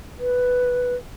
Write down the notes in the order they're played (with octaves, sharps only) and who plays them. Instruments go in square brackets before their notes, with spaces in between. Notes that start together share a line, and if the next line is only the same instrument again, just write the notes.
[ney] B4